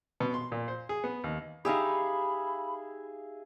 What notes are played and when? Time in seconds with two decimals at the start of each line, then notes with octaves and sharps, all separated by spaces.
0.20 B2
0.34 C6
0.52 A#2
0.68 C5
0.89 G#4
1.04 B3
1.24 D#2
1.65 D#4 G4 G#4 E5 F5 B5